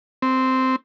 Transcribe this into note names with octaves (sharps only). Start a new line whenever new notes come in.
C4